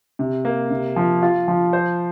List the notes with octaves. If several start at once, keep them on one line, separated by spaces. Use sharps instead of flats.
C3
A#3
C3
F3
F4
F3
C5